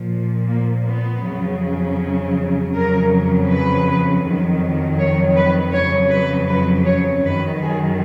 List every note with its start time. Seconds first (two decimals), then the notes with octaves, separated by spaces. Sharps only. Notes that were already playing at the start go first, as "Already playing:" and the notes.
Already playing: A#2 F3
0.48 A#3
0.86 B3
1.23 F2 C#3 F#3
2.74 F2 C#3 F#3 A#4
3.48 B4
4.22 F2 D#3 F#3
4.98 C#5
5.36 B4
5.72 F2 C#3 F#3 C#5
6.10 B4
6.48 B4
6.86 C#5
7.23 F#2 D#3 F#3 B4
7.61 G#4